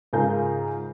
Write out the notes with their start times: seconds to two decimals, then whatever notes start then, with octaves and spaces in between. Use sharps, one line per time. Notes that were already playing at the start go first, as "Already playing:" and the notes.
0.13 G#2 C#3 F4 G#4 A#4 G6